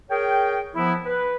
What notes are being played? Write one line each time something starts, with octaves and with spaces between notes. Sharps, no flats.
G#4 A#4 C#5 G5
F3 B3 E4
B4